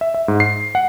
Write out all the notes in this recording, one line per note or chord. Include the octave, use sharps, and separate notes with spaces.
E5
E5
G#2
C7
F#5